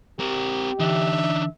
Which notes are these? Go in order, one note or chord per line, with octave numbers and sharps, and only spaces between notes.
C4 G4 A#4
D3 E3 D4 D#4 E5